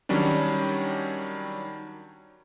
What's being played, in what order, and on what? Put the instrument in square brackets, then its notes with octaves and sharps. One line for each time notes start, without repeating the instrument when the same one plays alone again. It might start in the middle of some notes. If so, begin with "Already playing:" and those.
[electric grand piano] D#3 F#3 G3 C#4 D4